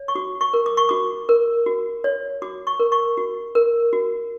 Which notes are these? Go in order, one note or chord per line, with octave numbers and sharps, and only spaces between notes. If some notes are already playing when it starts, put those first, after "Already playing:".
Already playing: C#5
C#6
F#4 D6
C#6
A#4
D6
C#6
F#4 D6
A#4
F#4
C#5
F#4 D6
C#6
A#4
C#6
F#4
A#4
F#4